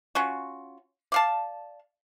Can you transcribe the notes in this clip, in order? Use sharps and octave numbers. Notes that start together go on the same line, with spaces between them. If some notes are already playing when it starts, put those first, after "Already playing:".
C#4 F4 F#4
D5 F5 A5